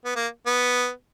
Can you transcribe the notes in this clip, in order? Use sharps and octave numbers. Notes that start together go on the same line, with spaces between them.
B3
A#3
B3